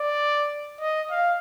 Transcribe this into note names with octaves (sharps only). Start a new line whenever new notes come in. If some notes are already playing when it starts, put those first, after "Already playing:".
Already playing: D5
D#5
F5